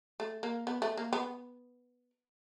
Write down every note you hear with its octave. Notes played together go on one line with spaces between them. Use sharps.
A3
A#3
B3
A3
A#3
B3